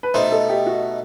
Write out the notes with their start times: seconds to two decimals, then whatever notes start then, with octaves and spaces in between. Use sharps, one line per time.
0.03 B4
0.14 B2 A3 D#4 C5
0.32 A4
0.49 G4
0.66 F#4